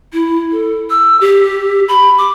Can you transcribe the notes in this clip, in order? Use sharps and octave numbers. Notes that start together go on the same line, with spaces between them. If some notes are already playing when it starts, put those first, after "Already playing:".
E4
A4
E6
G4
B5
D6